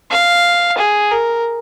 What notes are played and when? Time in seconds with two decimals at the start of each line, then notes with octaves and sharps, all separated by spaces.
0.10 F5
0.78 G#4
1.11 A#4